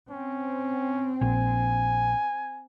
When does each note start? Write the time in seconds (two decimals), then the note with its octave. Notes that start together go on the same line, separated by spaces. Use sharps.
0.10 C4 C#4
1.21 A#1 G#5